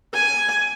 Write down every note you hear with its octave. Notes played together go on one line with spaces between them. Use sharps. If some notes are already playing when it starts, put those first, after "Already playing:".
G#5